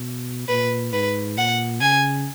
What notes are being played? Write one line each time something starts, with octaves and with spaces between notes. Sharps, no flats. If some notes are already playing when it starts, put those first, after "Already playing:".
Already playing: B2
A#2 B4
G#2 B4
A#2 F#5
C#3 G#5